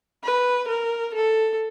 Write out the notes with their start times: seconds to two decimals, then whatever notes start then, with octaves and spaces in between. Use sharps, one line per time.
0.24 B4
0.68 A#4
1.15 A4